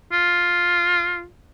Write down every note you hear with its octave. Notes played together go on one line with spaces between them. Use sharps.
F4